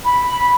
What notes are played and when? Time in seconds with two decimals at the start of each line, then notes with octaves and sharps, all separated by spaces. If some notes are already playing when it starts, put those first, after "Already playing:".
0.05 B5